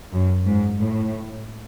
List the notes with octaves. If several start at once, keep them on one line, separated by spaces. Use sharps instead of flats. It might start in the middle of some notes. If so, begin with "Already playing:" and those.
F#2
G#2
A2